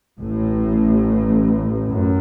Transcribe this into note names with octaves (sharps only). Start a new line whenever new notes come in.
A1 A2
F#2